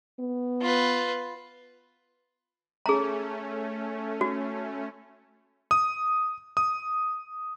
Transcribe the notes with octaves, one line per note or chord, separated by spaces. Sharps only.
B3
F4 B4
A3 C#4 G#4 A#5
F#4
D#6
D#6